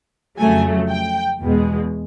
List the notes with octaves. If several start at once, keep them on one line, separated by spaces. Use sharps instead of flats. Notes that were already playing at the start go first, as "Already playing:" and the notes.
F2 C#3 F#3 A3 G#5
G5
E2 B2 G#3